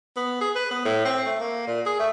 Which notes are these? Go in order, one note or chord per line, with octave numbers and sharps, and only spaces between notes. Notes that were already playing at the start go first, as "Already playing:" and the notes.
B3
G#4
B4
B3
A2
C4
A3
A#3
A#2
G#4
A3